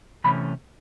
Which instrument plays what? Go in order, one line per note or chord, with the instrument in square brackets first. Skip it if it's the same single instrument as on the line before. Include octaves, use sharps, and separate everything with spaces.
[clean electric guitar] C3 E3 A3 C#4 B5